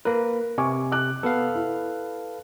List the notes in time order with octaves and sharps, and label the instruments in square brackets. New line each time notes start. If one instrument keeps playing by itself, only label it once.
[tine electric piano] A#3 B4 [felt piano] A#4
[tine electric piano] C3 [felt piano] G#5 C#6 D6
[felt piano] D6 F#6
[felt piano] B3 [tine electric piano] A4 B4 F5
[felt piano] E4